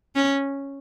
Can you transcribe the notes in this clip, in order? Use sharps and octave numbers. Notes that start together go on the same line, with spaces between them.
C#4